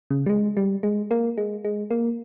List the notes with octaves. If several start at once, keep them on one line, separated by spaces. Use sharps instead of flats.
C#3
G3
G#3
G3
G#3
A#3
G#3
G#3
A#3